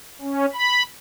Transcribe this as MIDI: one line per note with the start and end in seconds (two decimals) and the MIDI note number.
0.22 0.46 61
0.53 0.83 83